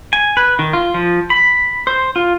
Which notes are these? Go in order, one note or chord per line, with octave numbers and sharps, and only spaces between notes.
G#5
B4
D#3
F4
F3
B5
C5
F4